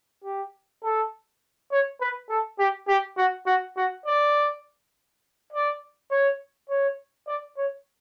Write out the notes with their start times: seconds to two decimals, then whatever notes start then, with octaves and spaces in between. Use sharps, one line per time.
0.25 G4
0.84 A4
1.71 C#5
2.01 B4
2.30 A4
2.59 G4
2.88 G4
3.17 F#4
3.46 F#4
3.77 F#4
4.06 D5
5.53 D5
6.11 C#5
6.70 C#5
7.27 D5
7.57 C#5